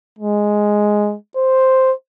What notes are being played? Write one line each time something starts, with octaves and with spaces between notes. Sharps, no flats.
G#3
C5